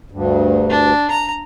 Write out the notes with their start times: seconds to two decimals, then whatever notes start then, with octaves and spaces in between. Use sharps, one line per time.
0.11 D2 G2
0.70 D4
1.11 A#5